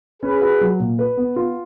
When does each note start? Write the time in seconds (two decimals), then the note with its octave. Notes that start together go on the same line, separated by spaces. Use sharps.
0.23 C#4 G#4 B4
0.41 F#4
0.61 F#3
0.80 A#2
0.99 B4
1.17 B3
1.36 F4